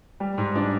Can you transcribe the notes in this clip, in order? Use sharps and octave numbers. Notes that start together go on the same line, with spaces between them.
G3
G#2
D4